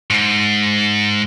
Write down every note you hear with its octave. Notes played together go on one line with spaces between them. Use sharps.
G#2